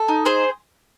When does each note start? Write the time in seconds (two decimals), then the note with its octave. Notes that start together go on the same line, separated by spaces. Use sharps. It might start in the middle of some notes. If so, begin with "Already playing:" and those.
Already playing: A4
0.08 D#4
0.25 G#4 C5